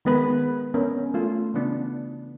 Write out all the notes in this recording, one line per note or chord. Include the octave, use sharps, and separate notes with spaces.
D#3 G#3 B3 A#4 B4
B4
B3 C#4 D4 A#4
A3 F4
C#3 E3 B3 D4